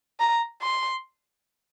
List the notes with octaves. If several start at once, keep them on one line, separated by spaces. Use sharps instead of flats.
A#5
C6